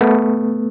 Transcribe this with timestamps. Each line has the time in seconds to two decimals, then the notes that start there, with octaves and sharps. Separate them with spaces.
0.01 A3 B3